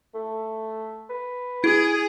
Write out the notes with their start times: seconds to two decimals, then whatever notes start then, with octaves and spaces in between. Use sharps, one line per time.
0.14 A3
1.10 B4
1.64 E4 G#4